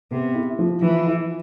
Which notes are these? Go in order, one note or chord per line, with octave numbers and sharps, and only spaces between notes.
C3 B3
E4
F3
E3 F3
E4